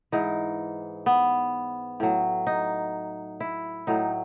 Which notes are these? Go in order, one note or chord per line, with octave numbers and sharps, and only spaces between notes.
G#2 E3 D#4
B3
A2 F#3
D#4
E4
A2 F#3 D#4